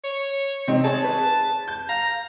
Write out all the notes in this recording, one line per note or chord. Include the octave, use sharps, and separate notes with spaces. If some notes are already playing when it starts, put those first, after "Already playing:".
C#5
C3 C4 D#4
G#4 C#5 A5
B4
G6
F5 A#5